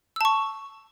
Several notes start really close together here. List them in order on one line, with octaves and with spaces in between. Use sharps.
E6 A5 C#6